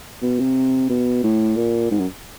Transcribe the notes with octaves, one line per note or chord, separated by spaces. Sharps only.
B2
C3
B2
A2
A#2
G#2
F#2